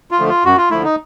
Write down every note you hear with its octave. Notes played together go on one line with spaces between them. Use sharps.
F4
D3 F3 A3
F4
F#2 F#4
F4
D3 F3 A3 E4
D#4